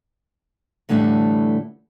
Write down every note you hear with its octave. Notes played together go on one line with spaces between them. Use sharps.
A2 D3 E3 G3 A3